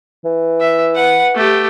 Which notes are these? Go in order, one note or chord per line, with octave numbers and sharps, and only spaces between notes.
E3
E5
B4 F#5
A3 G4